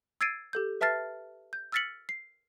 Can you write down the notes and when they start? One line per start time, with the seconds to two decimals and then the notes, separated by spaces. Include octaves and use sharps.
0.21 E6 G#6 A6 C7 D7 D#7
0.53 G4 A4 G6
0.81 B4 E5 A5 F6 A6 C7
1.53 G6
1.72 E6 F6 A6 B6 C#7 F#7
2.09 C7